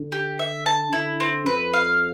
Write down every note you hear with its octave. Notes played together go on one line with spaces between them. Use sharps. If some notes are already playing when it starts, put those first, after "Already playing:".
Already playing: D3
G4
E5
A5
D3 E4
C4
F2 B4
F5